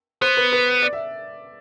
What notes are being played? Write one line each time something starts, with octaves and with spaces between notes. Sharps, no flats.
B3 C5
B4
B4
D5
E5